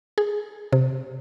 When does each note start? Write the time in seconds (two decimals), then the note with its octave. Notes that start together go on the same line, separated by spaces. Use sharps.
0.18 G#4
0.73 C3